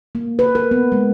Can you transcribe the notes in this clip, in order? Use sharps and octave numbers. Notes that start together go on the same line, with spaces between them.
A#3
B4
A#4
B3
G#3